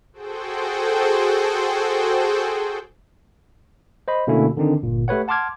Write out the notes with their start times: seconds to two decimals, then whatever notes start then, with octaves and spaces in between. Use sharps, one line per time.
0.13 F#4 G#4 A4 C5 G5
4.08 C5 D#5 B5
4.27 B2 D3 A3 A#3 C#4 E4
4.57 D3 D#3 C4 D4 D#4
4.83 G1 A#2
5.08 A3 G4 B4 C#5 F#5
5.28 F#5 A5 C6 D6 F6 G#6